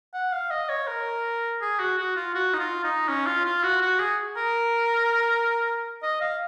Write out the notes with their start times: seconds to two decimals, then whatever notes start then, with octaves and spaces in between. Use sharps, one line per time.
0.14 F#5
0.32 F5
0.51 D#5
0.69 C#5
0.88 A#4
1.62 G#4
1.80 F#4
1.98 F#4
2.16 F4
2.35 F#4
2.54 D#4
2.59 F4
2.84 D#4
3.08 C#4
3.26 F4
3.45 F4
3.63 F#4
3.82 F#4
4.00 G#4
4.37 A#4
6.03 D#5
6.21 F5